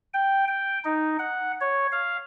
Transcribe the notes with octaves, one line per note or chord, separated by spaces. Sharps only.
G5
G5
D#4
F#5
C#5
F5